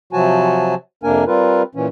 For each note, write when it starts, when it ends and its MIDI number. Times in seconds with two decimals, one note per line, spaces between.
0.13 0.75 48
0.13 0.75 53
0.13 0.75 54
0.13 0.75 66
0.13 0.75 80
0.13 0.75 81
1.03 1.24 41
1.03 1.24 48
1.03 1.24 58
1.03 1.24 62
1.03 1.24 70
1.03 1.24 80
1.27 1.63 55
1.27 1.63 60
1.27 1.63 65
1.27 1.63 70
1.27 1.63 71
1.75 1.88 46
1.75 1.88 52
1.75 1.88 61